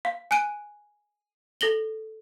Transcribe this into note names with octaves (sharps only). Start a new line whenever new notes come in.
F5
G#5 F#6 D7 D#7
A4 A#6 F#7 G7